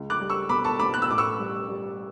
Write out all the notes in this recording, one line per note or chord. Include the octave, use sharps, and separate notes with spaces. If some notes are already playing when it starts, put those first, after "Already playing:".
Already playing: C#2
D6 F#6
G3
C#6 E6
B2 B5 D6
A5 C#6
B2 B5 D6
F#6
E6
A1 D6
C#6 E6
G3
G3